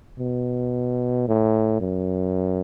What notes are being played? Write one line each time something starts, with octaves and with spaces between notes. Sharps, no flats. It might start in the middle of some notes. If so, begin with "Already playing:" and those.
B2
A2
F#2